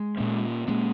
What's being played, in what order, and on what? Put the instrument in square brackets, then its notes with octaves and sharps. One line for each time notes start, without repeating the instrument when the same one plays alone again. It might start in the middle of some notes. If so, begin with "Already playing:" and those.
Already playing: [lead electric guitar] G#3
[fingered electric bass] A#2 A#3 C#4
[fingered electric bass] A#2 A#3 C#4 [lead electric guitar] G#3